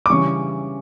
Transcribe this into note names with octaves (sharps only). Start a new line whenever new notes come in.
D6
C#3 E3 G3 C#4 C#6